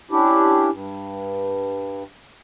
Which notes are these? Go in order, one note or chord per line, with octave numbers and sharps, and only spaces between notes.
C#4 D4 E4 G4
G2